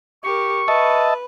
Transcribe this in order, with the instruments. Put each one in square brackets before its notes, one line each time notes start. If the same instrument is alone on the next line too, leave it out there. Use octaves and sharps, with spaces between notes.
[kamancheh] G4 A#4 [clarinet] C#6
[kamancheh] B4 [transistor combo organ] D#5 E5 A5